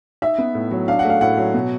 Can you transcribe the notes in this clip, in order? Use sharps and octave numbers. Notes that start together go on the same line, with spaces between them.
D#4 E5
B3
A2
F#3
D4 F5
F#5
A3
F5
A2 F#5
F#3
B2